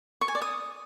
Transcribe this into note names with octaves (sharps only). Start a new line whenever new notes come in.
C#6
G#5
D5
D#6